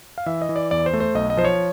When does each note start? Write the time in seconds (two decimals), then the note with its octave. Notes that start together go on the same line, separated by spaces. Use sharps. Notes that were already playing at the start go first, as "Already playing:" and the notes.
0.18 F5
0.26 E3 E5
0.42 D#5
0.49 E3
0.56 D5
0.71 E2 D5
0.86 C5
0.93 A3
1.00 C5
1.15 B1 D#5
1.30 D#5
1.37 F3 C5
1.45 C#5